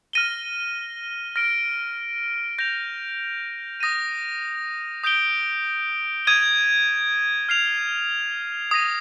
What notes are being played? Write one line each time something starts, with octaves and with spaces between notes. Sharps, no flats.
F6 A#6 D#7 G7
F6 A#6 D7
G6 A#6 F7
D#6 A#6 D#7
D#6 G6 D7 G7
D#6 G#6 D#7 G7
F6 C7 F7
D#6 A#6 D#7